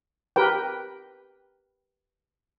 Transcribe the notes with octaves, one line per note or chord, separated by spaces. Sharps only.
G4 A#4 B4 G5